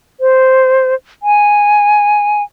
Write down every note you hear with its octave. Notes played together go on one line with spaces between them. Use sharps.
C5
G#5